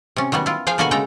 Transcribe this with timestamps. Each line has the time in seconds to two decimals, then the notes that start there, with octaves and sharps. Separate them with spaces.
0.16 C3 C#4
0.32 D#3 F#3 G3 B3
0.46 E4 F4
0.67 F3 G#4 F5 G5 G#5
0.78 B2 D3 A#3 B3 F#4 G#5
0.91 C#3 G#3 A4 G5 A#5